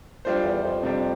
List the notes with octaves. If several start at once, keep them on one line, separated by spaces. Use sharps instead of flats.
F2 G3 D4 F4 C5
E2
F2
C3 G3 D4